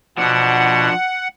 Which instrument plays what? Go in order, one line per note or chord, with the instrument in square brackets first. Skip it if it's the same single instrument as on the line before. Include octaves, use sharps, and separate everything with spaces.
[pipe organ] B2 [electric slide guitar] F3 D4 [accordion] F#5